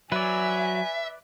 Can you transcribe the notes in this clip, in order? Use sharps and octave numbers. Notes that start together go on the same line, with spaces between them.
F#3 B4 D5 E5 G#5